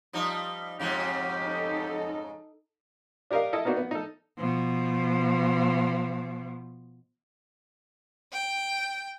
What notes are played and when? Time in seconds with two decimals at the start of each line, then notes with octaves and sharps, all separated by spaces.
0.13 F3 G3 D#4
0.80 F2 G#2 C#3 G4
1.42 D#4 A4
3.31 D4 G4 A#4 D#5 F5
3.53 E4 A4 D#5
3.65 A#3 B3 D#4 F#4 D5
3.77 B3
3.91 D#4 A4
4.38 B2 F3
8.32 G5